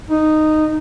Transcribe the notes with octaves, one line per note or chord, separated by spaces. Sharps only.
D#4